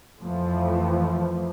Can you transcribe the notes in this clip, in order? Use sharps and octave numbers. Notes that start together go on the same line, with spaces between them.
F2 E3 F3 A3